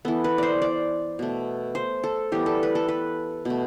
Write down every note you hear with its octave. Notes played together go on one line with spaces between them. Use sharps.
E3 B3 A4
B4
C5 D5
D5
B2 A3
C5
A4
E3 G3 B3 G4
A4
B4
A4
B4
B2 A3